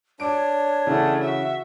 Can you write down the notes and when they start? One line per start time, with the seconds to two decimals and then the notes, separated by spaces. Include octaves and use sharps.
0.20 D4 C#5 D6 D7
0.87 C#3 E3 A3 F#5
1.21 F#4 E5